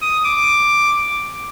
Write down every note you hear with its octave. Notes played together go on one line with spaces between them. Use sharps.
D#6
D6